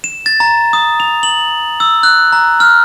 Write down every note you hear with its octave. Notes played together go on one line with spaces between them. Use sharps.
E7
A6
A#5
D#6
F7
F#7
E6
F#6
A#5
F6